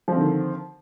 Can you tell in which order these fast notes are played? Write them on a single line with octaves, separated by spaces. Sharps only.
F3 C4 D3 D#3